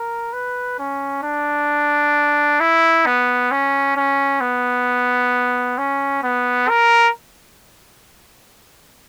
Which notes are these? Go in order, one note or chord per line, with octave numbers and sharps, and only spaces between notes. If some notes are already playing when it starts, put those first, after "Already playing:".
Already playing: A#4
B4
C#4
D4
E4
B3
C#4
C#4
B3
C#4
B3
A#4